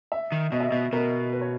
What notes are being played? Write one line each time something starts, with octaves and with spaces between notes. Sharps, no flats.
E5
D#3
B2 D#5
E5
B2 D#5
B2 A#4
B4
C#5